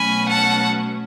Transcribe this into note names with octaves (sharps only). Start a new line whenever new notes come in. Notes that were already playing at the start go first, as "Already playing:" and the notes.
Already playing: B2 F#3 A3 C#4 G#5 B5
F#5 A5